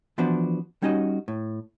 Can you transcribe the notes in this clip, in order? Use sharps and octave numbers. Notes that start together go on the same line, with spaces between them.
E3 F3 B3 D4 F#4
G3 C#4 D#4 F#4 D#5
A2